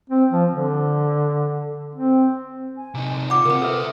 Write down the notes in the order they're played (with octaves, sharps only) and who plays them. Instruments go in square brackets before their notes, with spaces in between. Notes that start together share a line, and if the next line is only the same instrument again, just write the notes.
[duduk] C4
F3
D3
C4
[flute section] G#5
[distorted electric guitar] C3 D#4
[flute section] F4 F#5 [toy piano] B5 D6
[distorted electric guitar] C#3 C4 [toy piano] A#4 B5
[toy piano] A4 B4 [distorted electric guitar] C5 E5